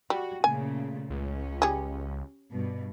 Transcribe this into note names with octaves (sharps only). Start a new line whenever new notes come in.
G3 F#4
A#2 C#3 A3 G#5
C#2 C#4
G3 G#4
G2 B2